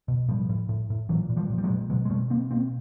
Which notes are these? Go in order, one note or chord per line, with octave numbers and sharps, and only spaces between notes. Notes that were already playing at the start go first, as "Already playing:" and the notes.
B2
A2 F3 G3
A2
A2
A2
A#2 E3 F#3
A#2
F3 G3
A#2
G3
F#3 G#3
A#2
B2 F#3 G#3
G#3
B2 G3 A3
B2 A#3 C4
B2 A#3 C4